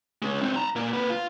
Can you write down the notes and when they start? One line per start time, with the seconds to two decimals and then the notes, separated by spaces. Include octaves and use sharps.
0.22 G#3 C#4
0.42 C4 D#4
0.56 A5 A#5
0.76 A#2 A#3
0.93 A#3 B4
1.10 F4